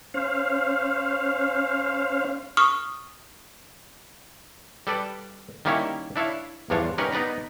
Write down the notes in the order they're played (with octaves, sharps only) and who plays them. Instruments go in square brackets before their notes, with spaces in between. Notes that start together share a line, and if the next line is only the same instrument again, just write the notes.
[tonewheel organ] C#4 C5 F5
[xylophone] C#6 D#6 F6
[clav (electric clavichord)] G3 A4 B4 D5
D#3 G3 A#3 C#4 E4 C#5
D4 E4 C#5 F5
E2 G2 F3 D4 C#5 F5
G3 C#4 D#4 A#4 B4 F#5
B3 D#4 B4 D5 A#5